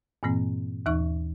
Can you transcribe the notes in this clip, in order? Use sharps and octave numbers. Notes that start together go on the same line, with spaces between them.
G2 A#2 E3 A#3 C4
D#2 E3 D#4 E5 C#6